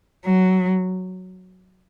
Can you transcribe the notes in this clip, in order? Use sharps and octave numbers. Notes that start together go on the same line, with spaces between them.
F#3